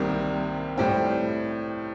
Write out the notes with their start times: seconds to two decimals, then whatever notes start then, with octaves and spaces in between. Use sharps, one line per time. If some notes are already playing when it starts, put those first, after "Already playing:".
Already playing: C2 C3 D#3 G3 A#3
0.77 A2 G3 C4 G5